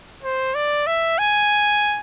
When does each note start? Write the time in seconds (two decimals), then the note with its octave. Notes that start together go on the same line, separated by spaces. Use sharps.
0.23 C5
0.55 D5
0.87 E5
1.19 G#5